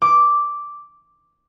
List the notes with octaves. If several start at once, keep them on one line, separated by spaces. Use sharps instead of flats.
D6